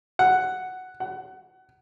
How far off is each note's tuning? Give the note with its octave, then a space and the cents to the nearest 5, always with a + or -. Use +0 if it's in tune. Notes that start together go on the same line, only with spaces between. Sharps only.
F#5 +5
F#5 +25